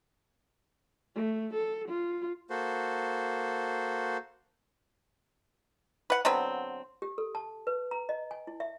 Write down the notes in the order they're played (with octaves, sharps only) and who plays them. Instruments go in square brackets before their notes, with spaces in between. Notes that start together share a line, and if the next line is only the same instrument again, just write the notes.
[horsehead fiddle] A3
A4
F4
[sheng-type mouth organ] A#3 F#4 A4 C5
[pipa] B4 F#5
D3 F#3 B3 C4
[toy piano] G4
A4
A5
B4
A#5
D#5
G#5
E4
E5